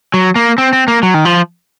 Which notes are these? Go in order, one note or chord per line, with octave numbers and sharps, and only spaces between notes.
F#3
A#3
C4
C4
A#3
F#3
D#3
F3